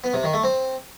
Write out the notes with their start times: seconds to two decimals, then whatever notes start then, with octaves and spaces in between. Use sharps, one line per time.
0.04 B3
0.14 C3
0.24 D#3
0.33 A3
0.43 C4